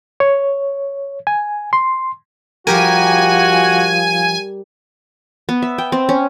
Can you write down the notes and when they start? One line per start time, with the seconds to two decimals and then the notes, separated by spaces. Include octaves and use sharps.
0.20 C#5
1.27 G#5
1.73 C6
2.67 F3 G3 F#4 G4 A#4 G#5
5.49 B3
5.63 E5
5.78 G5
5.92 C4
6.09 C#4